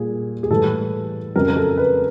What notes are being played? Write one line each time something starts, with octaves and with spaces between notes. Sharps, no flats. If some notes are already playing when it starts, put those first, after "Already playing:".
Already playing: A#2 G3 G#4
G#4
A2 E3 G3 A4
F2 C#3 F#3 A#4
A#4
A4
B4